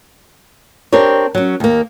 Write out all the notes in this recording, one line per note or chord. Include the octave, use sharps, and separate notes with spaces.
C4 D4 G4 A#4 C#5
F#3 C#4
D#2 A#3